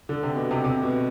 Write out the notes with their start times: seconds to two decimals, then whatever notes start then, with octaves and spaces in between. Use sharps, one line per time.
0.09 D3
0.23 C3
0.36 B2
0.51 C3
0.64 C3
0.83 B2